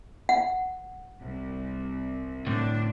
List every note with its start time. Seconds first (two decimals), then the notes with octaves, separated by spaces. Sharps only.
0.29 F#5
1.20 C2
2.47 A2 D3 D4